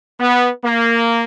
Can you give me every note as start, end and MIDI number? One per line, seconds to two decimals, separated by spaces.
0.20 0.49 59
0.63 1.23 58